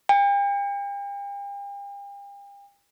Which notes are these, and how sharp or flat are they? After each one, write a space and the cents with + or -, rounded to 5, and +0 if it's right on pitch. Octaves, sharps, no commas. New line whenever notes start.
G5 +40